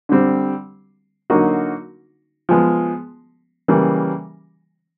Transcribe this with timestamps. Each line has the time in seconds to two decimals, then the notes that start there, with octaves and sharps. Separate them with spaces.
0.09 D3 G3 C4
1.30 D3 F#3 A#3 D#4 F#4
2.49 F3 G#3 B3
3.68 C#3 E3 G3 A#3